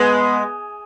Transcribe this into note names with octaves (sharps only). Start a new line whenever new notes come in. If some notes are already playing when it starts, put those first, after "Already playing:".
Already playing: G#3 B3